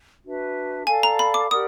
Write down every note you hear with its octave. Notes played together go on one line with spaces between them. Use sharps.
D4 F#4 B4 E5
A4 D5 F5 G#5 A5
A#5
B5
D6
G4 A#4 D5 F#5 D#6